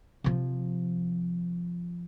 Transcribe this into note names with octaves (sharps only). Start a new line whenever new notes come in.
C3 F3